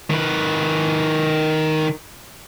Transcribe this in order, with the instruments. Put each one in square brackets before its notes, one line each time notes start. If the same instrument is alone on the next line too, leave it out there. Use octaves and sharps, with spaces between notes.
[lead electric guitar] D#3 B4